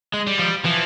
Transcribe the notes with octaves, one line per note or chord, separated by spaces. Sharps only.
G#3
G3
F3
E3 F3